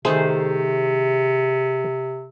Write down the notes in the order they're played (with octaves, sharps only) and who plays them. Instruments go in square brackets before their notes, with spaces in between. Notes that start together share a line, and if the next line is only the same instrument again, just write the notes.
[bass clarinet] C3 [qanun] D#3 A3 C5 [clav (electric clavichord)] G#4